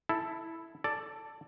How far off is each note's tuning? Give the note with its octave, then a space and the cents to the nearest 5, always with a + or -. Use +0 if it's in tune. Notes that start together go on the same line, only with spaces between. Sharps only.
E4 +0 A4 +0
A4 +5 D5 +0